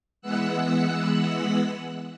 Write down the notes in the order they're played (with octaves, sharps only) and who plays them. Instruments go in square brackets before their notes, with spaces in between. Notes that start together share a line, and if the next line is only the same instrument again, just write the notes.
[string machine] E3 G#3 B3 F#5 E6 F#6